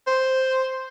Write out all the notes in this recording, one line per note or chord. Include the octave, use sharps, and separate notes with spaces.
C5